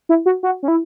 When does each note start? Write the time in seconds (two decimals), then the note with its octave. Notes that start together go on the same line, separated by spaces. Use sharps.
0.09 E4
0.26 F#4
0.43 F#4
0.63 C#4
0.68 E4